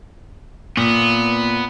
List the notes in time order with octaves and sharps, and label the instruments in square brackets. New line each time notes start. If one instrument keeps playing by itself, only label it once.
[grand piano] A#2 [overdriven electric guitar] B3